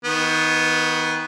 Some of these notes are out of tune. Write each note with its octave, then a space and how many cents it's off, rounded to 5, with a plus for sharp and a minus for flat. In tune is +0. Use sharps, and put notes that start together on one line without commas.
D#3 +25 B3 +0